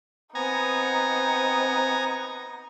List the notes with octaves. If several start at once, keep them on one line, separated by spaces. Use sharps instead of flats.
B3 C4 D#4 G#5 A#5